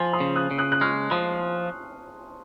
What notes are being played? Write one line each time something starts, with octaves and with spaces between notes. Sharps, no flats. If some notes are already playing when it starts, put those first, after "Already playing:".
Already playing: F3 G#5 C6
C6 D#6
C#3
D#6 F#6
C#3
D#6 F#6
F#6
G#3 C#6 F6
F3 C6 D#6